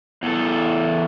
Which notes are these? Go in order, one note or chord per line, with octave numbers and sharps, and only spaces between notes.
E2 A4